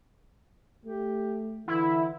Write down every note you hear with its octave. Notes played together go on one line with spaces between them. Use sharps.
A3 G4
D3 E3 E4